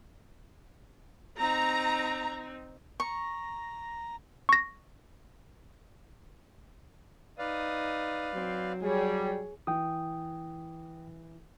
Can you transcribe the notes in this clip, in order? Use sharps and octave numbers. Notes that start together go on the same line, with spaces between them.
C4 D#4 A#5
A#5 C#6
C#6 A#6
D#4 B4 D5 F5 D#6
F#3 C4
G3 G#4 C#5
E3 G5 D#6